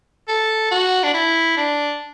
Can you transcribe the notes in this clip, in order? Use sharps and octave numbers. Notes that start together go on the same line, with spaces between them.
A4
F#4
D4
E4
D4